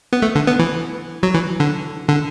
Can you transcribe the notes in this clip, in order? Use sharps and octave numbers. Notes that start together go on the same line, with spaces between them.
B3
A3
D3
B3
E3
F#3
E3
D3
D3